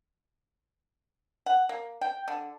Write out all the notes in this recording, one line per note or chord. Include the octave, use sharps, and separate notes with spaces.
F#5
A#3
G5
D3